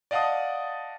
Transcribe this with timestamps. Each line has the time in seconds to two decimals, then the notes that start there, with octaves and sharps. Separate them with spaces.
0.11 D5 D#5 F5 F#5 A5 D#6